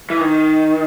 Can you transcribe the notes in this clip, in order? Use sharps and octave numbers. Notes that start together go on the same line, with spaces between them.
E3
D#3